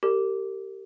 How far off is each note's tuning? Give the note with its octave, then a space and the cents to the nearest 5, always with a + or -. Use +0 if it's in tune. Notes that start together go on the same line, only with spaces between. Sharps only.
G4 -10 A#4 -35